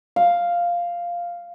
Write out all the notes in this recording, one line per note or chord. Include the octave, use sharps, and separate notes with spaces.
F5